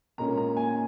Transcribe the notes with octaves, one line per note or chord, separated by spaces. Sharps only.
A#2 G#3 C#4 A#5
A#5
G#5